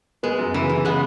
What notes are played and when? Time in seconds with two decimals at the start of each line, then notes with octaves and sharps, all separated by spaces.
0.23 G#3 B3
0.39 F#2
0.54 C#3 E3
0.69 C#3 E3
0.84 C#3 G#3 B3